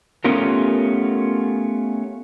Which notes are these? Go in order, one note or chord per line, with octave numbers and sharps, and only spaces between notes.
A3 B3 C#4 F4 G4 A#4